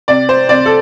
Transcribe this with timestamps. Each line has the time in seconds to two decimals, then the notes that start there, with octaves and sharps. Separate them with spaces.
0.08 C3 D5
0.29 C5
0.49 C3 D5
0.66 A4